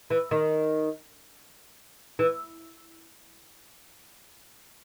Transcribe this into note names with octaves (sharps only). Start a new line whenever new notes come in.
E3
D#3
E3